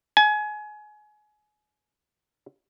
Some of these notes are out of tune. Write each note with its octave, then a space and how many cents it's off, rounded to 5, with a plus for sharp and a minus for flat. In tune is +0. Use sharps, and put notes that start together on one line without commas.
G#5 +25